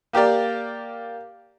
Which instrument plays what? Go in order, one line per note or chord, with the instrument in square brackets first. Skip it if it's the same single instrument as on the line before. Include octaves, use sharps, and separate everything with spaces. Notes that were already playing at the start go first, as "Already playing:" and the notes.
[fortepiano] A#3 G4 A#4 D5